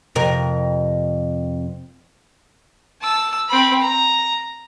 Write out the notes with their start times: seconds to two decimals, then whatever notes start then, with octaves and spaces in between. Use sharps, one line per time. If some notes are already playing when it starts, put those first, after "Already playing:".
0.15 F2 C3 A#4
3.01 A5 E6
3.48 C4 B5
3.80 A#5